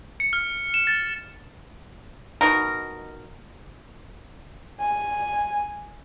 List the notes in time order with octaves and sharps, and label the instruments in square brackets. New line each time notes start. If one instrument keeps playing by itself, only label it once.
[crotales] C#7
F6
E7
A6
[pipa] B2 F#3 D#4 A#4
[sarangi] G#5